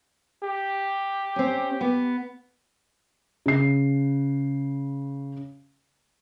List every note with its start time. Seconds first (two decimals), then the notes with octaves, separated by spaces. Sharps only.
0.43 G4
1.36 C4 C#4
1.81 B3
3.46 C#3 C7